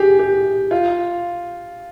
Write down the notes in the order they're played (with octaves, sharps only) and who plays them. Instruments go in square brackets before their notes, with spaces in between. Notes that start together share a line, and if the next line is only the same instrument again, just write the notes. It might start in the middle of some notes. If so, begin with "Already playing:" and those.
Already playing: [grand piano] G4 G#4
G4
F4